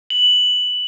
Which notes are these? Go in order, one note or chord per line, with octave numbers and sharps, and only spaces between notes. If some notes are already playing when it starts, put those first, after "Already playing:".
F#7